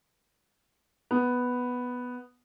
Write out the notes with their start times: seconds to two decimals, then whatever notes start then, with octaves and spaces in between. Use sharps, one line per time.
1.11 B3